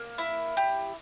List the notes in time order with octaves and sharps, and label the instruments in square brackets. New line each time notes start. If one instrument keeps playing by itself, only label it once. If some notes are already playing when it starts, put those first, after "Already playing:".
Already playing: [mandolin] A#3
E4
G4